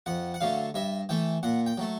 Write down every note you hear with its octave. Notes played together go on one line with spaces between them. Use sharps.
F2 F#5
F#5
D3 F#3 A3 F5
G2 E5
E3 A3 G5
A#2 F#5
G5
F#3 A3